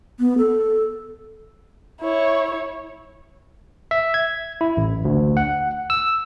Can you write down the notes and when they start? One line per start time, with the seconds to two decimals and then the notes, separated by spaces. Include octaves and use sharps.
0.19 B3
0.38 A4
2.01 E4 C#5
3.91 E5
4.14 G#6
4.61 E4
4.77 A1
5.05 D2
5.37 F#5
5.90 E6